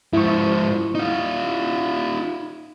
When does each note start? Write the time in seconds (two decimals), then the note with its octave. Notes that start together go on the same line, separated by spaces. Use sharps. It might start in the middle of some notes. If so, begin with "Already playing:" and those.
0.13 G#2 F3 E4 C#6
0.95 D#4 F4